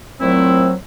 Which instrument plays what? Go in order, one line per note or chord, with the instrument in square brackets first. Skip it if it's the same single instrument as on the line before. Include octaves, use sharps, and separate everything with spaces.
[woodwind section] A#2 A3 E4 [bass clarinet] F#3 [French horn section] C4